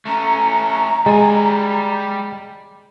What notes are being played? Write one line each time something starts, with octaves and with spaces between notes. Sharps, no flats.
A3 C#4 A#5
G3 G#3 G#5